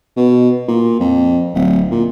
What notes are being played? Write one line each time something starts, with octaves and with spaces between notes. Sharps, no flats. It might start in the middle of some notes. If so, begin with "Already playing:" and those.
B2
A#2
F2
D1
A#2